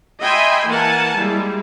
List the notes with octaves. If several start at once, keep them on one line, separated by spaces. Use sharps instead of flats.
D#5 E5 G5 G#5 B5 C6
E3 A#3 A#4 F#5 G#5 A5
G3 G#3 A#3 E4